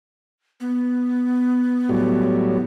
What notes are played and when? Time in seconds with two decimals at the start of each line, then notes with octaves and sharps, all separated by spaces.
0.60 B3
1.89 A2 F#3 G3